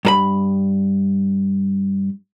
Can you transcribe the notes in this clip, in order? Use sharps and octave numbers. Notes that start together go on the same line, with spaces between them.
G2 A4 B5